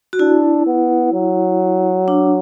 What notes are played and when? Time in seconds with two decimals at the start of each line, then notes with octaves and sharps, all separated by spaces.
0.13 F#4
0.19 D4 E4
0.67 B3
1.13 F#3
2.08 D4